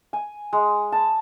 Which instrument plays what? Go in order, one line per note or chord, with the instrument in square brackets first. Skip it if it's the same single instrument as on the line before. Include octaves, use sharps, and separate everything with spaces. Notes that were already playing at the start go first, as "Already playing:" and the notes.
[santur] G#5
G#3
A5